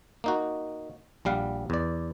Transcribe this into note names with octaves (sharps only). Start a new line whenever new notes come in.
A#3 D#4 F#4
A#1 G3 F5 F#5
E2 D5